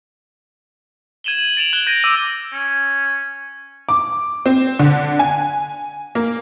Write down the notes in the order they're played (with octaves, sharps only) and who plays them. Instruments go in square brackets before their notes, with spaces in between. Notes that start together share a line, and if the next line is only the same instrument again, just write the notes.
[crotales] G#6 D#7 E7 F#7 G7
F#7
A6 D7 E7 F7
F#6 G#6 E7 G7
G6 A6 A#6 D7 D#7 G7
D6 E6 D#7 G7
[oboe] C#4
[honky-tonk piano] D6
C4
D3
G#5
A#3